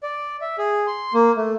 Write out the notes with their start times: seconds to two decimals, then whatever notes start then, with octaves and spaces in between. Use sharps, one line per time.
0.03 D5
0.41 E5
0.58 G#4
0.87 C6
1.14 A#3
1.37 A3